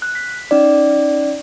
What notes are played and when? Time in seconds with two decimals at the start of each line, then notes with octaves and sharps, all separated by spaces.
0.02 F#6
0.15 B6
0.51 C#4 D#4 D5